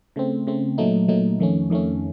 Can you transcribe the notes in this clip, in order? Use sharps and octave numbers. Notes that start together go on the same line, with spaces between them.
C#3 A3 C4
C#3 A3 C4
A#2 F#3 A3 D#4
A#2 F#3 A3 D#4
F2 D#3 A3 C#4
F2 D#3 A3 C#4